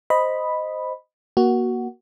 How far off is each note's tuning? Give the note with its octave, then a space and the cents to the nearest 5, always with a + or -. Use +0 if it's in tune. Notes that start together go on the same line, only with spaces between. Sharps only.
C5 -5 D#5 +0 B5 +0
A#3 +25 F#4 +10